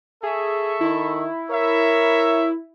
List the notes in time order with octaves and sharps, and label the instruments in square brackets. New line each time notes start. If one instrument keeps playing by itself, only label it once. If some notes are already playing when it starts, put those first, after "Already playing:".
[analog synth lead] G#4 [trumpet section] A4 E5 C#6
[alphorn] D#3 [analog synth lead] E4
[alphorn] A#4 [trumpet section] C#5 E5